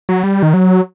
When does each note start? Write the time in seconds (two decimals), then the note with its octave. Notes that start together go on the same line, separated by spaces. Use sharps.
0.09 F#3
0.24 G3
0.43 D#3
0.54 F#3